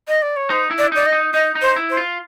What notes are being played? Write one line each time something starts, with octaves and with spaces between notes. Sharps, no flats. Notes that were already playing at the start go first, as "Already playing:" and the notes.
D#5
D5
C#5
D#4 C5
E4
D5
D#4 D5
D#5
D#4
D#4 D#5
D#4
C5
E4
C5
F4